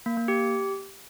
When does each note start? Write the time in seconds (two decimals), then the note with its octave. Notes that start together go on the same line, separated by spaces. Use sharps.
0.06 A#3
0.17 A#3
0.28 G4